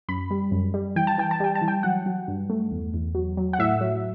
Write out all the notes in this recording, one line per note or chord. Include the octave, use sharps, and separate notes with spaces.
F#2 B5
G3
F#2
G3
E3 G5
A5
E3 G5
A5
G3 G5
A5
E3
G5
F#3 F#5
F#3
G2
A3
E2
E2
F#3
F#3
F#5
A2 E5
F#3